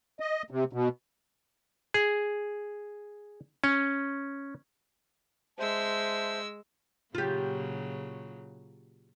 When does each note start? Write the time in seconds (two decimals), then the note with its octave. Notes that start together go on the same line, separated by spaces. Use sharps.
0.20 D#5
0.50 C3
0.73 B2
1.94 G#4
3.64 C#4
5.58 G#3 C5 E5 A5 E6
7.15 A#2 C#3 F#3 F4 G4